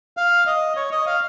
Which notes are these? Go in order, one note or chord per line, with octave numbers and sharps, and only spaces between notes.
F5
D#5
C#5
D#5
F5